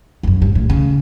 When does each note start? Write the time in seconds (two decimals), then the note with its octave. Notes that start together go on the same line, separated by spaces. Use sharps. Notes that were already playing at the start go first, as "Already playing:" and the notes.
0.23 F2
0.27 F#2
0.42 G2
0.55 A2
0.70 C#3